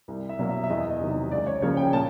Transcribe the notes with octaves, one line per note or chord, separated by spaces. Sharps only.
C2
E5
B2 F#3 A#3
E5
E5
E2 D#5
D#5
C3 D#3 F#3
C#2 D5
C#5
C#3 F3 A#3 C#5
G5
A#2 A5